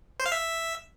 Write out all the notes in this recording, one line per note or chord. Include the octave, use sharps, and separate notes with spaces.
C5
F5
E5